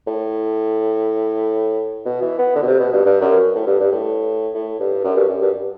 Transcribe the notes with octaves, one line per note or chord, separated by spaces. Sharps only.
A2
B2
E3
B3
D3
B2
C3
B2
G2
G2
F#2
A2
G2
G2
A2
A2
G2
F#2
G2
F#2
G2